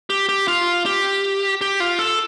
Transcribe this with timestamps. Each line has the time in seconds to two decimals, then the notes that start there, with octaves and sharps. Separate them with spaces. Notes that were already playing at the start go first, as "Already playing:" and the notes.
0.10 G4
0.29 G4
0.48 F4
0.86 G4
1.61 G4
1.80 F4
1.99 A4